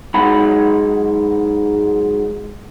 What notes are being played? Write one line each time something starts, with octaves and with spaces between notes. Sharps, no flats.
G#2 F#3 G#3 F#5 B5